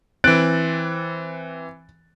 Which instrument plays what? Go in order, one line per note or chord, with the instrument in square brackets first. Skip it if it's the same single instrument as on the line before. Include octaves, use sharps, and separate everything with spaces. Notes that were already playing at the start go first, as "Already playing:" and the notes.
[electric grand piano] E3 C4 [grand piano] F#6 A6 D7